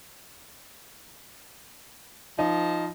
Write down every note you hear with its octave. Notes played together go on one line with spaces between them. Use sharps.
F3 D#4